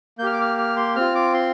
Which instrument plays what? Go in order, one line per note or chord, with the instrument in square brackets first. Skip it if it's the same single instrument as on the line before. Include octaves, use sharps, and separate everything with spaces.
[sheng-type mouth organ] A#3 G6
G4 F6
D6
F6
F6
C6
C4 F4 F6
D6
C6